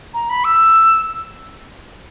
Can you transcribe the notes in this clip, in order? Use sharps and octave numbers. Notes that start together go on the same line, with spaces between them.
A#5
B5
E6